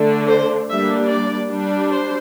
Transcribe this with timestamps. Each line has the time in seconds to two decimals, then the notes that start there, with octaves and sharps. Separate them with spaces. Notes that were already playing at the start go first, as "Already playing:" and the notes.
Already playing: D3 A3 D4
0.29 C5
0.69 G3 A#3 D4 E5
1.09 D5
1.49 G3 D4
1.89 C5